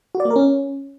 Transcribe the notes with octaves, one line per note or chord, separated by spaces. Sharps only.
F#4
D5
A#3
A#4
C#4